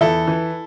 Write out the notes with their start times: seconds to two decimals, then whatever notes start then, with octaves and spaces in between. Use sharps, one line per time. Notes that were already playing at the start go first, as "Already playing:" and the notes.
0.01 E2 E4 A4
0.28 E3